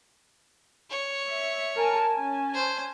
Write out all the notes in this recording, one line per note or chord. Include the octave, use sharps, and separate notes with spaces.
C#5
E5
A#4 G#5 A5
C#4 G#5 A5
C5